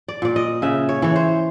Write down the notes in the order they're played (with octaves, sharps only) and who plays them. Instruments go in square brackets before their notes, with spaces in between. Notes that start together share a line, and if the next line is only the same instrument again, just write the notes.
[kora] D5
A#2 D5
D#5
C#3 E5
C#5
E3 C#5
C5